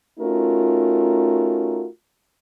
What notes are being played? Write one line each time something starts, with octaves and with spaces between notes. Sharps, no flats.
A3 C#4 D#4 F4 F#4 A#4